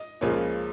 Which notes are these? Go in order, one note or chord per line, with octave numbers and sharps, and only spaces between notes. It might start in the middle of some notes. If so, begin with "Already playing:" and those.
Already playing: D#5
C#2 C#3 F3 A#3 C#4